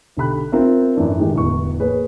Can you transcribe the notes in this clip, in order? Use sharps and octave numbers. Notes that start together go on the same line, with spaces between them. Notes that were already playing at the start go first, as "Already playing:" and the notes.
B1 D3 G4 B5 F#6
C4 F4 A#4 E5
F#2 A2 E3 D4
A2 D#3 G#3 G4
D1 E2 C#6
A#3 G#4 B4 C#5